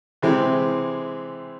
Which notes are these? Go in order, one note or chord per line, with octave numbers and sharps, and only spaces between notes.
C3 E3 G#3 C4 E4